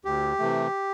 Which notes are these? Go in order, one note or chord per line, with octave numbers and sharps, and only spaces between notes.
D2 G4
C3 E3 A3